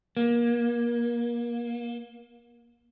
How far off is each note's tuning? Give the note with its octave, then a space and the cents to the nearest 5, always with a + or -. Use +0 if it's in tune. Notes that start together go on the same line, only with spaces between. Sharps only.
A#3 +30